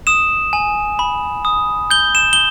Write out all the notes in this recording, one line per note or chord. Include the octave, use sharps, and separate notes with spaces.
D#6 E7
G#5
B5
D#6
G6 G7
E7
G7